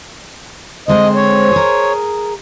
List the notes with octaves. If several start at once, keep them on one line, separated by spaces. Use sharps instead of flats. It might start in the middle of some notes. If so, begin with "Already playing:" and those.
D3 G#3 C4 C5 D#5
C#5
G#4 A#4